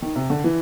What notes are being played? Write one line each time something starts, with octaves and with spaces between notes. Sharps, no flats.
D#3
C3
D3
E3